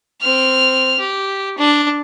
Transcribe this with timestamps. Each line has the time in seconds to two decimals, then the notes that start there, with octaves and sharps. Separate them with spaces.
0.21 C4 F6
1.00 G4
1.58 D4